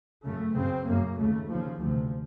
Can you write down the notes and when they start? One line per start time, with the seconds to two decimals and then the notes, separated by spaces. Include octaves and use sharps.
0.24 F#2 C#3 A3
0.55 F#2 C#3 C4
0.87 F#2 C#3 A#3
1.18 D#2 C#3 A3
1.49 D#2 C#3 F3
1.81 D2 C3 F3